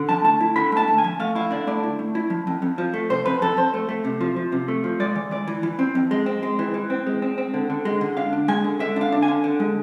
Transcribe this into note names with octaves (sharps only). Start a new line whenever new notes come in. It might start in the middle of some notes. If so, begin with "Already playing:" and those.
Already playing: D3
F3 A5
A3 A5
E4
D3 B5
A3 A5
A3
G#5
F3
A3 F5
E4 F5
D3 D5
A3 D5
E4
A3
E4
F3
F2
F2
F3
A3
C3 C5
F2 B4
F2 A4
F2 C5
A3
A3
C3
F3
F3
C3
A3
F3
G#3 D5
E3
E3 D5
E3
E3
C4
F2
G#3
C4
G#3
E3
E3
C4
G#3
C4
C4
D3
D3
G#3
D3
D4 F5
D4
G#3 G#5
D3
D3 E5
D4 F5
D4
G#5
D3
D3
G#3